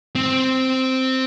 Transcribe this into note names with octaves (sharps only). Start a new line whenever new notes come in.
C4